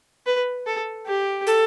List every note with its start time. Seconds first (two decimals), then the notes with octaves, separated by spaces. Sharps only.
0.26 B4
0.66 A4
1.06 G4
1.47 A4